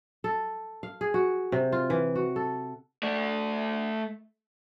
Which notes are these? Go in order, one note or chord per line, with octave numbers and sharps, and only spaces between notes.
A4
F5
G#4
F#4
C3
F4
E3
F#4
A4
A3 D5